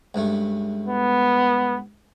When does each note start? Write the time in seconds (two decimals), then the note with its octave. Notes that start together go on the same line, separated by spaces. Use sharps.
0.14 C#2 G2 A3
0.88 B3